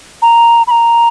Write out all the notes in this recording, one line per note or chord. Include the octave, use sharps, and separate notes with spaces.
A#5
B5
A#5